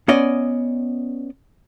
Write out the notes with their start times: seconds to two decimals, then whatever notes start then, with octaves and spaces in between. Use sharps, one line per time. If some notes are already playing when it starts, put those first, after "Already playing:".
0.08 B3 C#4 D5 D#5